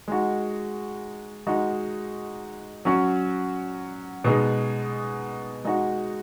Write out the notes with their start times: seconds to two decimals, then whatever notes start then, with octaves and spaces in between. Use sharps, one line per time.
0.08 G#3 D#4 F#4
1.47 G#3 D#4 F#4
2.85 F#3 C#4 F#4
4.24 B2 G#3 B3 D#4 G#4
5.64 G#3 D#4 F#4